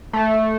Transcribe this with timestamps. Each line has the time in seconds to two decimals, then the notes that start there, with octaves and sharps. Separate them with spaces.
0.13 A3